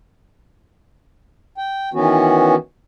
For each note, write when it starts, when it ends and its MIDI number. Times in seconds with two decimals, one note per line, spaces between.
1.58 1.89 79
1.94 2.55 51
1.94 2.55 52
1.94 2.55 59
1.94 2.55 61
1.94 2.55 66